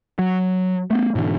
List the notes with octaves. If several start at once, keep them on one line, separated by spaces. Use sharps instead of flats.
F#3
A3 B3
G#2 B2 D3 E3